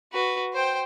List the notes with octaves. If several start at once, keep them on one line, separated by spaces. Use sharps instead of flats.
F#4 B4
C5 G5